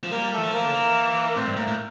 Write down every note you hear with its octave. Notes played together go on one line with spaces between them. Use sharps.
F3
G3 A#3 A#4
E3 A3 A4
F3
A#3 A#4
D3
E3
A2 C4 C5
G2
A2 A#3 A#4
A2